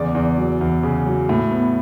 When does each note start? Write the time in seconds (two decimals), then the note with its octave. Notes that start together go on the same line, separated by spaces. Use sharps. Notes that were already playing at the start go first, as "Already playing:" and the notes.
Already playing: E2 C#3 D5
0.15 E2
0.38 F#3
0.61 E2
0.83 C#3
1.06 F#3
1.29 A2
1.51 B3